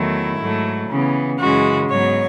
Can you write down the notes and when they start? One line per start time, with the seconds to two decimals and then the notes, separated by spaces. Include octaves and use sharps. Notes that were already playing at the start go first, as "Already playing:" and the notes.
Already playing: E2 D#3 F#3 A3 E4
0.39 G#2 F#3 A3
0.88 C#3 E3 B3
1.39 F#2 C#3 E3 G#3 F#4
1.89 G#2 F#3 B3 C#5